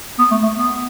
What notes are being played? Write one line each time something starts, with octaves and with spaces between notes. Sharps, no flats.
B3
A3
A3
B3